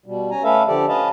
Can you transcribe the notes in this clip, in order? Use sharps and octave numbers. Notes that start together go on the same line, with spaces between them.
B2 G3
C#4 G#5 A#5
A3 C#4 A4 B4 E5 F5
D3 F3 G4 A4 D5
C#4 B4 D#5 F5 A5